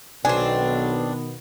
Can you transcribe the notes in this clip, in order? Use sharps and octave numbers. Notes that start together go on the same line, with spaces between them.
B1 B2 D#3 B3 C4 D4 G#5